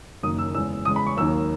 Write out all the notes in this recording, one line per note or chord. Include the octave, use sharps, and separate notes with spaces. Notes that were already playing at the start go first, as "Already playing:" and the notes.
F#1 F#2 D#3 A#3 D#6
E6
E2 C#3 G#3 E6
E2 C#3 G#3 D#6
B5
C#6
D#2 D#3 F#3 A#3 E6